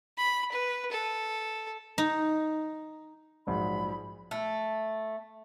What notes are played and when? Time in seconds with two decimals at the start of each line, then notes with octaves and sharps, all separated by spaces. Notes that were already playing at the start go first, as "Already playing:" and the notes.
0.18 B5
0.51 B4
0.92 A4
1.98 D#4
3.47 A#1 G#2 F#3 B5
4.31 A3